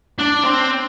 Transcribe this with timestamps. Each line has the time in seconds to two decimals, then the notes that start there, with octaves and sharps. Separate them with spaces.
0.19 D4
0.44 C4